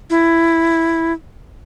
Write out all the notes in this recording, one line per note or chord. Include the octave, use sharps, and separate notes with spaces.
E4